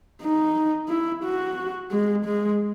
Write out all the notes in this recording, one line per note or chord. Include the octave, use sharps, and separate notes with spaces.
D#4
E4
F#4
G#3
G#3